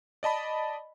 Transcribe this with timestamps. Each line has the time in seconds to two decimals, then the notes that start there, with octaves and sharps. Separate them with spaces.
0.23 D5 D#5 A5 B5